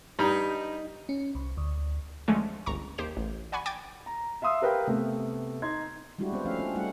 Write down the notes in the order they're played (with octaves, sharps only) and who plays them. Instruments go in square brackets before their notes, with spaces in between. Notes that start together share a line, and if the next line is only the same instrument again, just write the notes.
[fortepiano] G2 [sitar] D#4
[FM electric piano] C#4
C2
D2
[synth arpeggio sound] D3 F3 G#3 A3 C#4
G1 C#2 A#5 C#6
D#2 G4 C5 E7
A1
D5 F#5 G#5 B5 C#6
G5 G#5 D6 G#6 A6
[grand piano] A#5
E5 F5 C6 D#6 E6
G4 A#4 B4 F5 G5
C3 A3 B3
D#4 C6 G#6
[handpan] G3 G#3 D4 E4 F#4 G4
G3 B3 C4 C5
F3 A3 C#4 E5 F5
C4 D4
G3 A3 D#4 F#4 F#5